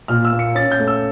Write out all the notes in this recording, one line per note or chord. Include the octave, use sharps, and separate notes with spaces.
A#2 F6
E6
A#3
C#7
C#4 A6
G6
A3
E6